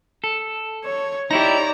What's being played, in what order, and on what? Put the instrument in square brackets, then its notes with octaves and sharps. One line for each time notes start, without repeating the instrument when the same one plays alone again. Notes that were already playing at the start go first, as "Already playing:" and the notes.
[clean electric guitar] A4
[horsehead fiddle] C#5
[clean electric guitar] D#4 E4 G4 [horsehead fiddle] C#5 D5 [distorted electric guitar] A#5